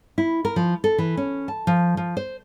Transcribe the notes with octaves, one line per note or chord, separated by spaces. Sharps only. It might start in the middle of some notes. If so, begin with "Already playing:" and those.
E4
A#4
F3
A4
E3
C#4
A5
F3
F3
C5